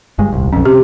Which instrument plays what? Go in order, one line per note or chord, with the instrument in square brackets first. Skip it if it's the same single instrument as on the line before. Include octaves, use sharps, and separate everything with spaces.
[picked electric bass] G1 G2 G#3
D#1 C2
[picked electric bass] B1 F2 [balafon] C#4
[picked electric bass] C3 [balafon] G4